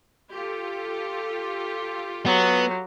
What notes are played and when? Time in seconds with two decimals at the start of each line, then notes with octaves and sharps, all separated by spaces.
0.32 F4 G4 A4
2.26 F#3 B3